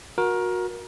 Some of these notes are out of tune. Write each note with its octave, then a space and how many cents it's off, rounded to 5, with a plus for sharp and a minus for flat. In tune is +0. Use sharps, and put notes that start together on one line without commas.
F#4 -20 A#4 +20